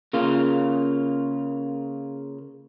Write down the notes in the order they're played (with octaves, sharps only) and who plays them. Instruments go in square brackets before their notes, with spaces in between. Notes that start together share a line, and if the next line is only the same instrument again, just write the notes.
[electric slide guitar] C#3 A#3 F4